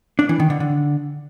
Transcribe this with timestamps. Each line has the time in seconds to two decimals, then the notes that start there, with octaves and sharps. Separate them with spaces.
0.19 D4
0.29 E3
0.40 D#3
0.50 D3
0.60 D3